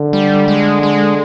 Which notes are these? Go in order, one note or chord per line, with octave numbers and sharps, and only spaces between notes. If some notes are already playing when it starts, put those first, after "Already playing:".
Already playing: D3
G3
G#3
G#3